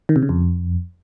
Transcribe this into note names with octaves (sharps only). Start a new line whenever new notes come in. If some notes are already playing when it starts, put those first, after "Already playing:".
D#3
C3
C#3
F2